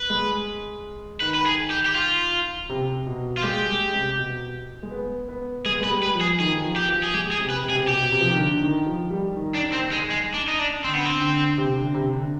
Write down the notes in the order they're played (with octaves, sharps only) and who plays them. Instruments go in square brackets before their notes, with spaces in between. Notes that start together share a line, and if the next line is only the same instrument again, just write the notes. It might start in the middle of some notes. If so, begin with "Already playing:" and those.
Already playing: [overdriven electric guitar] B4
[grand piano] G#3
[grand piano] D#3 [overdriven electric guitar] B4
[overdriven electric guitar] B4
G#4
G4
G4
F4
[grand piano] C3
B2
[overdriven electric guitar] F4
[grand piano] G#3 [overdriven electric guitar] G4
[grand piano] G#3
C3
B2
G#3
B3
B3
[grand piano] G#3 [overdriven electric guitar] G#4
[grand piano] B3
G#3
[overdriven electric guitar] B4
[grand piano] G3
[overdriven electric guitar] B4
[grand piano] F3
[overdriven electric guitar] G#4
[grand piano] D#3 [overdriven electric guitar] G#4
[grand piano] F3
D#3
F3
[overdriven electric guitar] G4
[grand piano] F3
[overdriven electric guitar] G#4
[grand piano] G#3 [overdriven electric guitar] G4
[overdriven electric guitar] G#4
[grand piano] C3
[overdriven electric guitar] B4
[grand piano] C3
[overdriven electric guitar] G#4
[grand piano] C3
[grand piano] B2 [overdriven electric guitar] G4
[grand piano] C3
F3
D#3
D3
D3
D#3
F3
G3
D#3
[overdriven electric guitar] D4
C4
G#3
G#3
D4
D#4
D4
[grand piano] D3 [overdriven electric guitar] C4
[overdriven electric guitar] B3
C4
[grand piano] D3
C3
D3
C3
D3